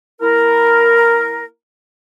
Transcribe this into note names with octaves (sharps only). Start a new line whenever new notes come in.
A#3 E4 A#4